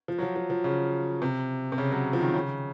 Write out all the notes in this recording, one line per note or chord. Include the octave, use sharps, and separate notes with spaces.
F3
F#3
F3
F3
F3
C#3
C3
C3
C#3
F#3
F3
D#3
C#3